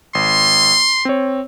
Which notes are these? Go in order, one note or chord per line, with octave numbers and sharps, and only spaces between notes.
G#1 C6
C4 C#5